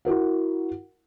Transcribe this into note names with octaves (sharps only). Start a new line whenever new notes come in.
E4 F#4 A#4 F#5